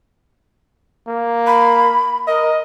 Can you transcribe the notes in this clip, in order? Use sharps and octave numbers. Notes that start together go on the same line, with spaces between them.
A#3
B5
A#4 D#5